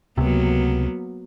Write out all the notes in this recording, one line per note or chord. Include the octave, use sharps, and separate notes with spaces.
C#2 C3 F#3 A#3 B3